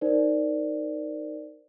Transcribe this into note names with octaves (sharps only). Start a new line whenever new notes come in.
D#4 A#4 C5 D5